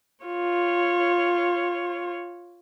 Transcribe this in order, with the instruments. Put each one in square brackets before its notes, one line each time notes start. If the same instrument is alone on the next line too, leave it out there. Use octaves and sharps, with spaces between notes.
[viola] F4 C#5